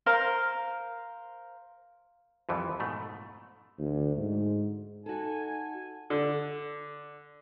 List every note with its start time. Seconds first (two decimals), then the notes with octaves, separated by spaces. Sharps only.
0.06 A#4 C5 F5
2.49 C2 F2 E3 F3
2.80 G#2 B2 A3
3.78 D2
4.17 G#2
5.06 D#4 F#4 A4 G#5
6.10 D3